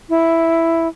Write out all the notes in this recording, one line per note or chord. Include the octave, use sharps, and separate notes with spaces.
E4